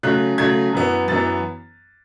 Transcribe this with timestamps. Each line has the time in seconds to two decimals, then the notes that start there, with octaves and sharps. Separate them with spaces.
0.03 C#3 F#3 A3 F#6
0.38 C#3 F#3 A3 G#6
0.73 F#2 E3 B3
1.08 F#2 E3 B3 A6